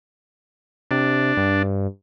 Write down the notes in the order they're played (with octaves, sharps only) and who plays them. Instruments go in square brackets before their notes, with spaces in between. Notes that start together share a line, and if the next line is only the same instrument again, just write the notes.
[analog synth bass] C3 [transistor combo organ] D4
[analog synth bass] G2